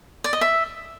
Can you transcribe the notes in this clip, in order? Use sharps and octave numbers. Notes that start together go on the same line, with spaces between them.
D5
D#5
E5